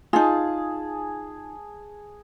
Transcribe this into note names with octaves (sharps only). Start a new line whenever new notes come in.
D#4 F4 G#4 A5